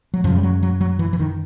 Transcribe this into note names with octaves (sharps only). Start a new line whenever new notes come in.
F#3
F#2 C#3 F3
G3
F#3
F#3
F#3
E3
E3
D#3